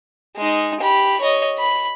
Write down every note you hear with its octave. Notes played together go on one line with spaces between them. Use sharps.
G#3 D#4
G4 B5
C#5 D#5
B5